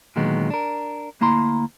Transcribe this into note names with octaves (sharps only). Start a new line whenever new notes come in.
A#2 D3 D#3 F#3 G#3 B3
D4 A#4
D2 A#3 E4 A#5 C6